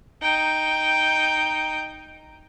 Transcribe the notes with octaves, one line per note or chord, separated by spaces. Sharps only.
D#4 G5